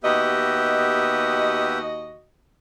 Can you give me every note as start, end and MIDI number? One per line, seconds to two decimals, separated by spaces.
0.04 2.23 39
0.04 1.78 59
0.04 2.23 66
0.04 1.78 67
0.04 2.23 75
0.04 1.78 76